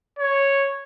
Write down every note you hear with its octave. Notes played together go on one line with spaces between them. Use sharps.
C#5